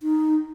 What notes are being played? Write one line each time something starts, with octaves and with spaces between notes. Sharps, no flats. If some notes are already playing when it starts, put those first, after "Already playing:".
D#4